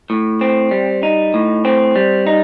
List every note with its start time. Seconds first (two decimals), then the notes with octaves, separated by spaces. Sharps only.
0.10 A2
0.41 C4
0.71 G3
1.03 D#4
1.34 A2
1.65 C4
1.96 G3
2.27 D#4